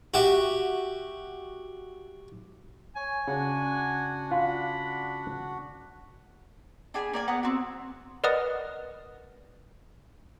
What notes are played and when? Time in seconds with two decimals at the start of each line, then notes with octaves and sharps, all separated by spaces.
0.14 F#4 G4 E5
2.96 C#5 G#5
3.28 C#3 D4 F#4 F#5
4.31 F4 B5
6.94 D4 G#4 G#5 B5
7.13 A#3 D5 G#5
7.28 B3 F#5 A#5
7.43 C4 F#4
8.24 A#4 B4 D5 D#5 F#5 D#6